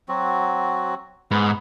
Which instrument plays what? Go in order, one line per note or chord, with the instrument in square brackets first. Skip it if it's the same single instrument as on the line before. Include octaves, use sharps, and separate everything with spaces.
[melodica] F#3 C4 F#4
[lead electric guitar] G#2 [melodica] B3 B4